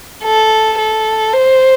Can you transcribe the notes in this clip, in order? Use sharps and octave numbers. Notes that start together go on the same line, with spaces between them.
A4
A4
C5